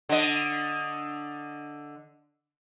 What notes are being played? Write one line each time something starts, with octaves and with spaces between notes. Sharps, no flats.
D3 D#5